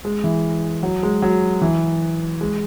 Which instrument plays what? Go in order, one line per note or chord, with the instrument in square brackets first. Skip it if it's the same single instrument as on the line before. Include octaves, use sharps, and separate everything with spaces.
[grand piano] G#3
E3
F#3
G#3
F#3
E3
G#3